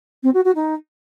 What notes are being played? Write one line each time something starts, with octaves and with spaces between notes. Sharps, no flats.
C4
F#4
F#4
D#4